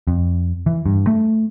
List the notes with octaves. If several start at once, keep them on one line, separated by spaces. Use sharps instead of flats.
F2
E3
G2
A3